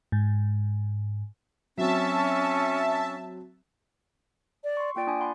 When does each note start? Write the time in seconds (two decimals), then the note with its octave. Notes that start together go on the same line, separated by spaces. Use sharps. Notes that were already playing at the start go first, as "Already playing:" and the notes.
0.12 G#2
1.77 F#3 C4 C#4 F#4 E5 A5
4.64 D5
4.77 C6 C#6
4.96 A#3 F4 D5 G5
5.07 D4 G#5 D6
5.20 F#5 B5 C6